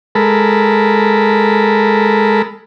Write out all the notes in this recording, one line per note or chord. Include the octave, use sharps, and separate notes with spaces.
G#3 A4 A#4 B5